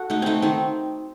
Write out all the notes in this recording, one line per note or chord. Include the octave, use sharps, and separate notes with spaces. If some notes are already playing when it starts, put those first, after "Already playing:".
Already playing: F#4 A4 B4
A3 D#4
A3 C4 D#4
D#3 C4